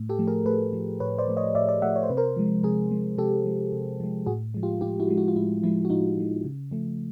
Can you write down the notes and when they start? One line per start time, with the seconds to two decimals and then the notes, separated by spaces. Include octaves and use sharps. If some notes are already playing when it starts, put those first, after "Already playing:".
Already playing: A2
0.09 G4 A4
0.19 F3 A3
0.27 G#4 A#4
0.45 A2 A4 B4
0.73 F3 A3
1.00 A2 B4 C#5
1.18 C5 D5
1.28 F3 A3
1.37 C#5 D#5
1.55 A2 D5 E5
1.69 D5 E5
1.82 F3 A3 E5 F#5
1.96 C#5
2.03 C5
2.10 C3 B4
2.17 A#4 C5
2.36 F3 G#3
2.63 C3 G#4 A#4
2.91 F3 G#3
3.18 C3 G4 A4
3.46 F3 G#3
3.73 C3
4.00 F3 G#3
4.26 A2 F#4 G#4
4.54 F3 G#3
4.63 F4 G4
4.81 A2 F4 G4
5.00 E4 F#4
5.08 F3 G#3
5.17 E4 F#4
5.28 F4
5.36 A2 E4
5.63 F3 G#3 E4
5.85 F#4
5.90 A2 D#4 F4
6.18 F3 G#3
6.44 C#3
6.71 F3 A3